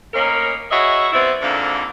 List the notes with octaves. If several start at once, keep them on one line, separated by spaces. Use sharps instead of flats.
A2 A#3 C#4 D#4 A#4
E4 F#4 G#4 C#5 D#5 E5
G3 B3 C4 E4
F2 G#2 D3 A#3 D4 A4